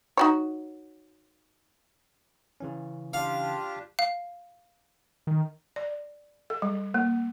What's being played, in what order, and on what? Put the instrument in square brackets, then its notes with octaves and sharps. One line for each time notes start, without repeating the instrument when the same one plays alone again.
[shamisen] D#4 F#4 C#5
[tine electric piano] C#3 E3 C#4
[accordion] D4 F4 G4 [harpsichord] F5
[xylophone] F5
[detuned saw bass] D#3
[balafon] D5
A4
G3
A#3